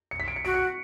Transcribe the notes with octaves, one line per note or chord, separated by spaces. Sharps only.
C#7
B6
D7
C#7
F#4 D7
C#7